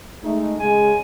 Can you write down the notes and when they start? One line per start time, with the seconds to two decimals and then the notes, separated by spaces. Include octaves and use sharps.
0.23 G#3 A3 D#4
0.60 C#3 G#3 G#5